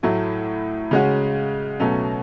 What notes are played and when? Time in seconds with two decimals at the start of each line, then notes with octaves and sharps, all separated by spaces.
0.03 A2 F#3 A3 E4
0.91 C#3 G#3 C#4 F#4
1.80 B2 F#3 A3 C#4